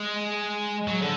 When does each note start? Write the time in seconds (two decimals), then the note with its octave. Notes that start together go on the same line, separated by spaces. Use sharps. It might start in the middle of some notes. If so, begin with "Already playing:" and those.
Already playing: G#3
0.87 F#3
1.02 D3